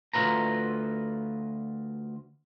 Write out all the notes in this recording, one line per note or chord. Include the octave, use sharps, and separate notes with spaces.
D2 B2 F4 B4 A#5